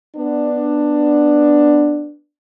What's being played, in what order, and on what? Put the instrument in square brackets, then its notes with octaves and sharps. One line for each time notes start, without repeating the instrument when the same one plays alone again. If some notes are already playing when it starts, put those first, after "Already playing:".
[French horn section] B3 D4